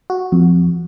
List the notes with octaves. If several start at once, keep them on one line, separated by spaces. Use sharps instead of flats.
F#4
F2